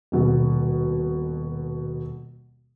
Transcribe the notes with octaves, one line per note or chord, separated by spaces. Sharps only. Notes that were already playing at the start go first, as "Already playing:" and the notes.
D#1 B2